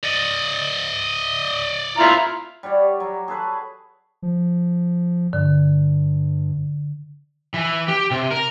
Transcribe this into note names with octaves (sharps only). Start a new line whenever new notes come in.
D5 D#5
E4 F4 A#5
G3 F#4 C#5 D5
F#3
G#4 A4 B4 C#5
F3
G2 D3
E3
G4
C3
A#4